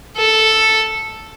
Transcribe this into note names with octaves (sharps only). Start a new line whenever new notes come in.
A4